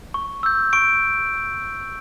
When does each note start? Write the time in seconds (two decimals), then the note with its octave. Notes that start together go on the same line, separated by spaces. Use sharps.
0.14 C#6
0.43 E6 G6
0.73 C#6 D7